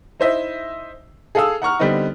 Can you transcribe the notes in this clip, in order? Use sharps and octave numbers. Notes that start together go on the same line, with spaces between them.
D#4 E4 C5 D#5 E5
G#4 A4 F5 D#6 E6
F#5 A#5 C#6 F6
D3 G3 B3 C4 D#4